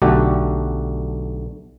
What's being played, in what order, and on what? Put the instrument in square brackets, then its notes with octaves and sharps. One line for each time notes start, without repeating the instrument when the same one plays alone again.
[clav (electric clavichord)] B1 D3 A3 F#4 G4